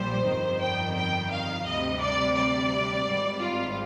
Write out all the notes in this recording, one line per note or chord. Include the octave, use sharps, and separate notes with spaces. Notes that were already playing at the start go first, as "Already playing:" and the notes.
Already playing: A#1 A#2 G3 C5
G1 F2 D#3 G3
G5
G5
F5
D2 C3 G3 D#5
D5
D5
G#1 G#2 G3
F4